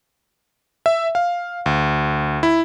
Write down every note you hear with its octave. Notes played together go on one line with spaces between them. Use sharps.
E5
F5
D2
E4